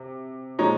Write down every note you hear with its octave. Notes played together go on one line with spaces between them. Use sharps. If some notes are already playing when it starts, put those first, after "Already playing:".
Already playing: C3
A#2 F3 G#3 D#4 C#5